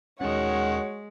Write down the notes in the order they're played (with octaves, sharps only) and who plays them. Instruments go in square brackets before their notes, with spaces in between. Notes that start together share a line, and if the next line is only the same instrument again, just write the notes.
[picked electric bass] D#2 C#4 [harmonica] D#3 F#5 [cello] G#3 [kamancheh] F#4 C#5